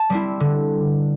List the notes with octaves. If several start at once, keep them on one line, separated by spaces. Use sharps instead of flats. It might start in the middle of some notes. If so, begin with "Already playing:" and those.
Already playing: A5
G3 C4 E4
D3